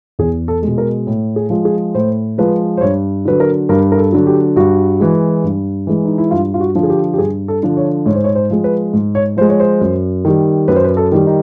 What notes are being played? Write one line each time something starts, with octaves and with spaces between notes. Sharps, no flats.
E2 G#4
A4
B2 G#3
A#4
A2
G#4
F3 G#3
G#4
A2 C5
F3 G#3 B4
C5
G2 C#5
D3 F#3 B4
A#4
G2 A#4
A#4
A4
D3 F#3
G4
G2 F#4
E3 G#3
G2
E3 G#3
D#4
E4
G2 F4
F4
F#4
D3 F3
G#4
G4
G4
G2 G#4
A4
D3 F3
C#5
G#2 C#5
C5
C#5
C5
F3 G#3
B4
G#2
C#5
F3 G#3 C5
C#5
C5
F#2
D#3 G3
F#2 B4
C5
B4
A4
D#3 G3
D#4